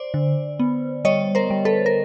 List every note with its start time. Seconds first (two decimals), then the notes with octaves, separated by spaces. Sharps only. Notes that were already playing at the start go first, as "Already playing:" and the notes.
Already playing: C5 D5
0.14 D3
0.59 B3
1.05 G3 C#5 D#5
1.35 A#4 C5
1.50 G3
1.65 A4 B4
1.86 A#4